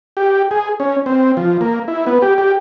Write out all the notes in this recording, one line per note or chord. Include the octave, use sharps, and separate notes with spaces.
G4
G#4
C#4
C4
F3
A#3
E4
B3
G4
G4